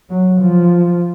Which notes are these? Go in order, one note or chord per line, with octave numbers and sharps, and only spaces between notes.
F#3
F3